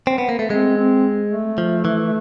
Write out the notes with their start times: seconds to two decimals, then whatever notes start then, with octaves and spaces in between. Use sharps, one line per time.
0.07 C4
0.18 B3
0.29 A#3
0.39 A3
0.50 G#3 C4
0.77 C4
1.31 A3
1.58 F3
1.85 E3